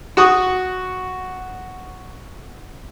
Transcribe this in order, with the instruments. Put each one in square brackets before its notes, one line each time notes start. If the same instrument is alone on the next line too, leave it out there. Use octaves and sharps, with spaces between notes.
[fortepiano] F#4 C#6 D#6